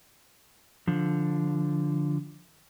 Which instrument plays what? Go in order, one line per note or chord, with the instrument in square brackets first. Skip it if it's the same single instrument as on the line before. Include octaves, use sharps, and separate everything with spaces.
[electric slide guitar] D3 F3